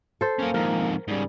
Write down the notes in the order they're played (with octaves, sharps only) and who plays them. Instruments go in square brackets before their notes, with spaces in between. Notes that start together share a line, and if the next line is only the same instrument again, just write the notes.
[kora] A4 C5
[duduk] A#3 [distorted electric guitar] C#4 A#4
[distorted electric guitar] F2 G#2 [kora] A#4
[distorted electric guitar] G#2 C#3 [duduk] G3